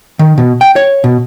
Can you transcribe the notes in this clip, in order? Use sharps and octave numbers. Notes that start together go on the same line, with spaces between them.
D#3
B2
G5
C#5
B2